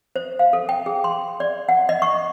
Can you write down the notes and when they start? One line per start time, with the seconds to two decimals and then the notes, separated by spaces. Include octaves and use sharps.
0.16 C5
0.39 F5
0.53 A4
0.69 G5
0.86 G#4
1.04 C6
1.40 D5
1.69 F#5
1.89 D#5
2.02 C#6